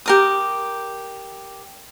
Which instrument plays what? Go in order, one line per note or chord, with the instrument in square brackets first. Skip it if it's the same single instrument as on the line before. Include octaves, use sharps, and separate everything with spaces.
[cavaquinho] G4 A#4 D#6